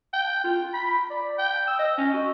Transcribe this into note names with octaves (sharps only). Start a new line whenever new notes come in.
G5
F4
B5
D5
G5
E6
D#5
C#4
F#4